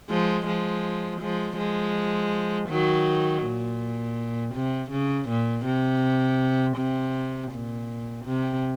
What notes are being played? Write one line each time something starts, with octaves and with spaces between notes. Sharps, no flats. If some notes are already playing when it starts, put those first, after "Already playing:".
F3 G#3
F3 G#3
F3 G#3
F3 G#3
D#3 F#3
A#2
C3
C#3
A#2
C3
C3
A#2
C3